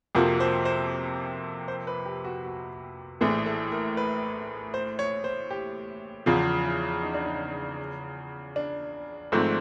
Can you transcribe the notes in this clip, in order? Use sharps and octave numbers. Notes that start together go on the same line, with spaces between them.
F2 C3 F3 A#3 F#4
C5
C5
C5
B4
G4
F#4
F#4
A#1 A2 E3 G#4
A4
A#4
B4
C5
C#5
C5
G4
E2 C#3 F3 F4
E4
D#4
D4
D#4
D4
G#1 G#2 F3 A3 C4